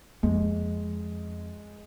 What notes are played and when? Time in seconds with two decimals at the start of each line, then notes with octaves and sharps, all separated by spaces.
0.23 F2 G#3